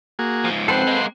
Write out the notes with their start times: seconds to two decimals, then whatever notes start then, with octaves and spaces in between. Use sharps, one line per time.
0.19 A#3 F#4 G#4
0.45 G#2 F3
0.68 C4 A4 B4 C5 F#5 G5 C6
0.87 G#3 A#3